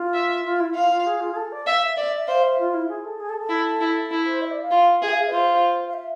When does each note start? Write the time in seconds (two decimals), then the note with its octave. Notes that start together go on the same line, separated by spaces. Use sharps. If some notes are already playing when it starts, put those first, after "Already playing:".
Already playing: F4
0.14 E5
0.45 F4
0.60 E4
0.74 F4 F5
0.90 F4
1.06 G#4
1.20 F4
1.31 G#4
1.36 A4
1.52 D5
1.66 E5 F5
1.82 E5
1.96 D5 E5
2.13 E5
2.27 C5 F5
2.42 E5
2.58 F4
2.73 E4
2.88 G#4
3.04 A4
3.20 G#4
3.29 A4
3.40 A4
3.49 E4
3.80 E4
4.11 E4
4.26 C5
4.41 E5
4.51 D5
4.62 F5
4.71 F4
5.02 G#4 E5
5.12 F5
5.22 E5
5.29 B4
5.32 F4 C5
5.87 F5
5.93 E5